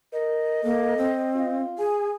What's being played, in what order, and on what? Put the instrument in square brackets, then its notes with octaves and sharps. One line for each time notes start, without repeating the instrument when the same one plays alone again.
[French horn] A#4 [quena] D#5
[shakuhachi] A#3 [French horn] A4
[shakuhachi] C4
[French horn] F4
[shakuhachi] G#4 [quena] G#5